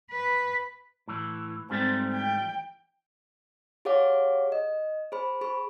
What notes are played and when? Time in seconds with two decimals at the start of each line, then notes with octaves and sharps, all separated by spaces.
0.11 B4
1.08 A2 E3
1.70 G#2 G3 A3 C4
2.12 G5
3.85 G4 G#4 C#5 F5 F#5 D6
4.52 D#5
5.12 G#4 C5 B5
5.41 G#4 B5 C#6